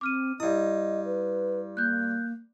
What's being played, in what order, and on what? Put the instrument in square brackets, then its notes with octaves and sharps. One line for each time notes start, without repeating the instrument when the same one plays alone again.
[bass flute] C4 [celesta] D6 F6 D#7
[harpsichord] G2 D#6 [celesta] E4 [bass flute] D#5
[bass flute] B4
[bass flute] A#3 [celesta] F#6 G6